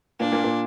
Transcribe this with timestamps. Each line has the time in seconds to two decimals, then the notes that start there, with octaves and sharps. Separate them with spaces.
0.20 A#2 A#3 D4
0.32 A#2 A#3
0.44 A#2 A#3